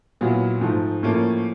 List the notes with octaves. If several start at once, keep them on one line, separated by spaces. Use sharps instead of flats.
A#2 F#3 B3 E4
G#2 F3 A3
A2 F3 A#3 C#4